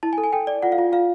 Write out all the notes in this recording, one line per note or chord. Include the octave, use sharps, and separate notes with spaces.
E4 A5
G#5
A4
G#5
A4 G5
D5
F4 F#5
F5
F4
F4 F5